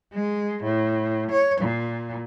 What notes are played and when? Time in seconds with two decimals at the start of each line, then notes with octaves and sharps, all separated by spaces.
0.13 G#3
0.63 A2
1.31 C#5
1.61 A#2